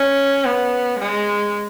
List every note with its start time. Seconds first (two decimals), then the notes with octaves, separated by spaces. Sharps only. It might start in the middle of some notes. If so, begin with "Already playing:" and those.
Already playing: C#4
0.45 B3
0.99 G#3